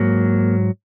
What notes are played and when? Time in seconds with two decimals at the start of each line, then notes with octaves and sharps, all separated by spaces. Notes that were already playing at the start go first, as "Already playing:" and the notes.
Already playing: G#2 F#3 A#3